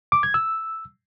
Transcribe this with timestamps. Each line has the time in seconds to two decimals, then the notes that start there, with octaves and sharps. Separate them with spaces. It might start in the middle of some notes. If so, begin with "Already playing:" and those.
0.12 D6
0.23 G#6
0.34 E6